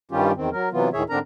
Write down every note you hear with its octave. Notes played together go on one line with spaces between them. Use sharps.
G2 D#3 G3 C#4 F4 G4
E2 D#3 C4
F#3 A#4
C3 E3 F#3 B3 F4
D2 A2 D#3 G#4 C#5 E5
G#2 D3 C4 D4 A#4 A#5